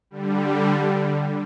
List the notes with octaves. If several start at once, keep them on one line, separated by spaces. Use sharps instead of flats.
D3 G3